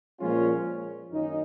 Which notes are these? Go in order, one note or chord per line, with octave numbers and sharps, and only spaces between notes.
A#2 F3 G#3 C#4 F4
F#2 D#3 A#3 C#4 D#4